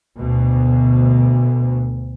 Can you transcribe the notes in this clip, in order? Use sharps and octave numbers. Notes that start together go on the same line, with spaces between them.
D2 B2